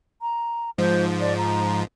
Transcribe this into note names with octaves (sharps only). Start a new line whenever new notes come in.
A#5
G#2 F3 C5
D5
A#5